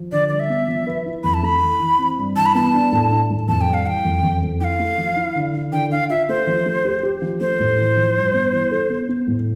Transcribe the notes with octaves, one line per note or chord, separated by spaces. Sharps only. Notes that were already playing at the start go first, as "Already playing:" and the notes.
Already playing: F3
D3 D5
G3 D5
E5
B3
F3
B4
E4
F2 B5
A5
A3 B5
E3
E3
C4
G2
E3 A5
B5
B3 A5
D4
A2
D4
A2
F2 A5
G5
G3
F5
E3 G5
F2
F2
F2
E4 F5 G5
A3
F3
E4
D3
E4
D3 G5
D4 F5
F4 E5
A3 C5
F3
A3
G4
G4
F3
A3 C5
A2
E3
F3
G2
B3
E3
A4
B3
B3
A2